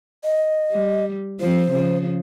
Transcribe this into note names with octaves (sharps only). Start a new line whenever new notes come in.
D#5
G3
F3 C4 C5
C#3 F3